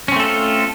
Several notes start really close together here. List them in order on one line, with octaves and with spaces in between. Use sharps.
C#4 C4 A3 A4 F4